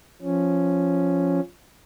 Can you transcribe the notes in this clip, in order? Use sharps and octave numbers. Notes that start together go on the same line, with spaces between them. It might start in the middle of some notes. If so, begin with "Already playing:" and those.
F3 C#4